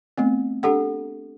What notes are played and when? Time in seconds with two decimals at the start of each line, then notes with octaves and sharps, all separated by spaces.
0.18 A3 B3 C4
0.63 D4 G4 A4 F#5